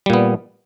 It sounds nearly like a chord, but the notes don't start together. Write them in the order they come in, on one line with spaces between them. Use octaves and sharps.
G3 A#2 B3